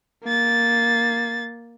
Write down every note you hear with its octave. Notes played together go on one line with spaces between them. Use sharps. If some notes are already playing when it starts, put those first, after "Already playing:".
A#3 A6